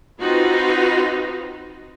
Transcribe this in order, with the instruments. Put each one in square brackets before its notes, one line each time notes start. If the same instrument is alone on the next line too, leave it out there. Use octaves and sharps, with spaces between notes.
[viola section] C4 D#4 F4 F#4 B4